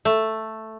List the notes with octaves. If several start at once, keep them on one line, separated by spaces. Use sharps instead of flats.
A3